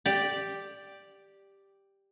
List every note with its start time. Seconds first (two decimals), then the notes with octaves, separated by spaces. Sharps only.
0.06 G4 D5